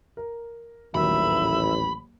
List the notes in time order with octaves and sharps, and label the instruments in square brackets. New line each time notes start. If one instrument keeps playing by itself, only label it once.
[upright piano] A#4
[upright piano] D#1 D#3 F#3 [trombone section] A1 [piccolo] E5 [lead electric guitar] B5